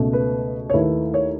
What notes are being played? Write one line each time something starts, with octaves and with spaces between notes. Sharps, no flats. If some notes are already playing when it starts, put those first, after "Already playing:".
Already playing: C#2 B2 A3
B4
C#5
D#2 D#3 A3 E4 B4
C#5